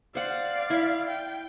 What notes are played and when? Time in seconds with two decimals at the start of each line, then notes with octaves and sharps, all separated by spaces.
0.15 C5 D5 F5 F#5
0.70 E4
1.09 G5